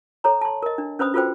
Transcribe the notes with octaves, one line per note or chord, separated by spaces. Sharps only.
A4 C#5 A#5
A5 C6
A#4 D#5
D4
C#4 B4 C5 B5 D#6
F4 F#4 A4 B4 C5 G5